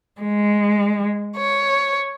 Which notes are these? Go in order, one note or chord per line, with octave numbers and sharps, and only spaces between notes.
G#3
C#5